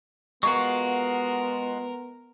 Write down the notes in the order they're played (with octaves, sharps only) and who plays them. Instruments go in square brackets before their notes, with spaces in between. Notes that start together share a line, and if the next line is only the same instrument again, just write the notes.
[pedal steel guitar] G#3 F4 F#4 [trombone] B3 [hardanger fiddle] A#4 [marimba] C#6